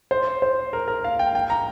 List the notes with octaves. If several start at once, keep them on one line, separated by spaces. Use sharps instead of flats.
C5
C5
A#4
A#4
F5
G5
G5
A#5